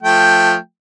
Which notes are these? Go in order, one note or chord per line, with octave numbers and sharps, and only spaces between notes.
F3 A3 G5